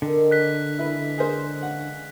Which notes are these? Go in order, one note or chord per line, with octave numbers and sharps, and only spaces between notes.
D3 D#3 A#4 D6
D5 F#6 B6
E3 G#3 E4 B4
G#4 A#4 C5
C#3 F#5